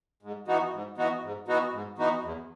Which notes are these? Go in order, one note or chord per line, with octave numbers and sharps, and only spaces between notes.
G#2
E3 B3 D#4 F#4
G#2
E3 B3 D#4 F#4
G#2
E3 B3 D#4 F#4
G#2
E3 B3 D#4 F#4
E2